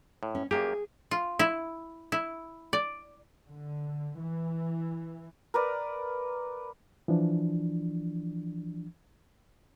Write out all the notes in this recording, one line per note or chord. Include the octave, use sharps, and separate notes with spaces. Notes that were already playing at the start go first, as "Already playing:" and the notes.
A2
C#4
F#2 A#3 G4 G#4
F4
E4
E4
D5
D3
E3
A#4 B4 D5
E3 F3 D4